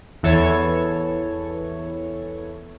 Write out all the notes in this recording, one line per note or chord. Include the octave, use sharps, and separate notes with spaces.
E2 E3 A4 C#5